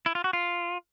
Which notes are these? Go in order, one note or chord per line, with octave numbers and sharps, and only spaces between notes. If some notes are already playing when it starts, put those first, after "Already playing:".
E4
F4
F#4
F4